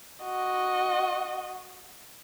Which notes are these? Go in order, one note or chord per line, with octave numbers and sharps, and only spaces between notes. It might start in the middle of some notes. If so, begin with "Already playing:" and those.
F#4 D#5